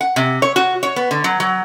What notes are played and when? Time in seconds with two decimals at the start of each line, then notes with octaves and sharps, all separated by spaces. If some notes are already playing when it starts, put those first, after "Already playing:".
0.01 F#5
0.16 C3
0.42 C#5
0.56 F#4
0.83 C#5
0.96 B3
1.11 D3
1.24 F#3
1.40 F#3